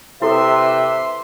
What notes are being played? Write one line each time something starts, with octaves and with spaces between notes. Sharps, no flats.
C3 E4 G4 A4 B4 E5 C6